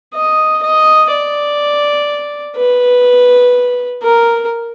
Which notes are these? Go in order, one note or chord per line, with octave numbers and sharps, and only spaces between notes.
D#5
D#5
D5
B4
A#4